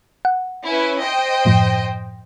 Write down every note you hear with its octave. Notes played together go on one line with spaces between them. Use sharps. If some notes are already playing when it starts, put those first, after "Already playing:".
F#5
C#4 E4 B4
C5 D#5 G5
F#2 A2 F3